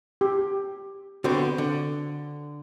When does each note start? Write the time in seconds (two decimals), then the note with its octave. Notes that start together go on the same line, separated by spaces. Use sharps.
0.21 G4
1.24 D3 B3 C4 F#4 C5
1.58 D3